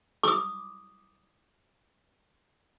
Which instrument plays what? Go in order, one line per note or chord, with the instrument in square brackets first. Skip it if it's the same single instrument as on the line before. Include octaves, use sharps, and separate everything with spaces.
[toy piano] D6 D#6